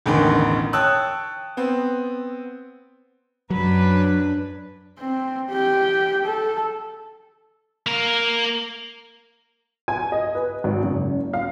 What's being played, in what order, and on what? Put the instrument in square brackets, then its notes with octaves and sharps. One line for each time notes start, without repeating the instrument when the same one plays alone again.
[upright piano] E1 A1 E2 D3 D#3
C#5 G5 A5 D#6 E6 F#6
B3 C4
[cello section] F#2 D4 B4 [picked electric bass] F#3
[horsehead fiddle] C4
G4 G5
A4
[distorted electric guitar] A#3 A#4
[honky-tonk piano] G#5
D#5
B4
G#1
F#1
F5